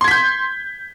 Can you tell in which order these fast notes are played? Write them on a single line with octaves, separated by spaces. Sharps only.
C6 G#6 B6 G6